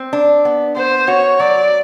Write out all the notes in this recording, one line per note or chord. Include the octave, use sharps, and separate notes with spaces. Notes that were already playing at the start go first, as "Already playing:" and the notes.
Already playing: C4
D4
B3
B3 C5
F#4 C#5
F#3 D5